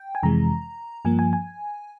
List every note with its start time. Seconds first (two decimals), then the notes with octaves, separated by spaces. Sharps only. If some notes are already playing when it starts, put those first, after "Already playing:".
Already playing: G5
0.15 G#5
0.23 F2 C3 E3 G#3 A#5
1.05 G2 F3 A#3 G#5
1.19 G#5
1.33 G#5